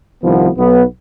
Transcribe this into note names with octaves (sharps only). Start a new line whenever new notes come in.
C2 D#3 F3 B3
B1 B3